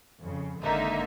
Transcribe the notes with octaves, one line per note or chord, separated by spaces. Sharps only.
F2 C#3
G#1 D3 A#3 D#4 E5